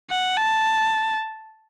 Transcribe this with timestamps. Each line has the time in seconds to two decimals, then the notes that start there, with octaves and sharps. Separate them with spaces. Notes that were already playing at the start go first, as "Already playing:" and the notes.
0.10 F#5
0.38 A5